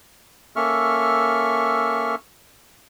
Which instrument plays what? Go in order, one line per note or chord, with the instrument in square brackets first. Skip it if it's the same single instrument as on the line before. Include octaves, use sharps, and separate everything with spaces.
[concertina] A#3 C#4 A4 E5 C#6 F6